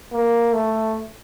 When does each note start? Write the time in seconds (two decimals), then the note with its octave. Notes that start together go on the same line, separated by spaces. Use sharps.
0.12 A#3
0.53 A3